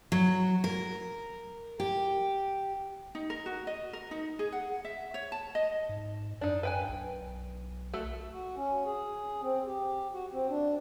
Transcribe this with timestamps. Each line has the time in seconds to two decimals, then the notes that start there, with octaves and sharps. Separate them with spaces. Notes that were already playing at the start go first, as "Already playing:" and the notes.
0.12 F#3
0.64 A#4
1.80 G4
3.15 D#4
3.30 A#4
3.46 F#4
3.67 D#5
3.93 A#4
4.11 D#4
4.39 G#4
4.52 F#5
4.85 E5
5.14 C#5
5.32 A5
5.55 D#5
5.89 G#2
6.41 F#2 D4 D#4
6.63 B4 G5 G#5
6.89 B1
7.93 A3 F#4 A4
8.32 F#4
8.56 C#4
8.86 G#4
9.42 C4
9.66 G4
10.13 F#4
10.32 C4
10.50 D4